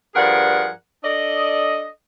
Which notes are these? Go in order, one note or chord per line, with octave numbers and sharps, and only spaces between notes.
G2 F3 G#4 A#4 D5 F#5
D4 A4 D5 D#5